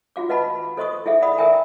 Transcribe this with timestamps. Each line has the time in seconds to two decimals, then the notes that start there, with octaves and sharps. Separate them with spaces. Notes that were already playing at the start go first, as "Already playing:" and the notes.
0.16 F4 F#4 F5 D6
0.29 B4 D#5 F5 F#5 A5 B5
0.77 A4 C5 D#5 C6 C#6 D#6
1.06 E4 G#4 A4 E5 F5
1.22 D5 F#5 B5 D#6
1.38 A4 A#4 E5 G5 G#5 A#5